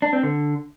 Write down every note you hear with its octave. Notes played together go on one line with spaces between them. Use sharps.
D4
C4
D3